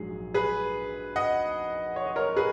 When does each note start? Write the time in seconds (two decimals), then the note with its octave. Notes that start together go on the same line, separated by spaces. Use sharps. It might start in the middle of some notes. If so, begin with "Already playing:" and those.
Already playing: A#1 G#2 F#3 G#4
0.34 G#4 B4
1.16 D#5 F#5
1.96 C#5
2.06 D#5
2.16 A#4 C#5
2.37 G#4 B4